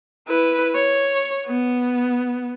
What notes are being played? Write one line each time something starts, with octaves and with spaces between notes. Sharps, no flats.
E4 B4
C#5
B3